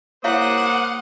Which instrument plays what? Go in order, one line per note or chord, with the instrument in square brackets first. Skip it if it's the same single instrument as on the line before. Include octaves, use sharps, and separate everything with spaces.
[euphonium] A#3 [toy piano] E4 C#5 F5 [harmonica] C5 D6 D#6 [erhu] F#5